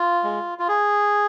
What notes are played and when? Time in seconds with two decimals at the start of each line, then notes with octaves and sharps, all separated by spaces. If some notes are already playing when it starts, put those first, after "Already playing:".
Already playing: F4
0.24 G#3
0.59 F4
0.68 G#4